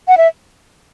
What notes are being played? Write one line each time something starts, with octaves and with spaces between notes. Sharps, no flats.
F#5
E5